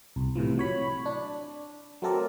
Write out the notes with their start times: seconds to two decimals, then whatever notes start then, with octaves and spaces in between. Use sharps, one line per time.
0.16 C2
0.36 A2 C3 E3 F3
0.58 F#3 C#5 B5
1.06 D4
2.02 F#3 A3 C4 A4 A#4 D5